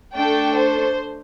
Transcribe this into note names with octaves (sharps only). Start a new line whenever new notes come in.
A3 D4 A4 G5
C5